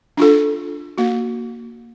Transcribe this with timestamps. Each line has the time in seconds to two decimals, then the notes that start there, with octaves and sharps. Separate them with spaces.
0.17 D4 F4 A4
0.98 A#3 F#4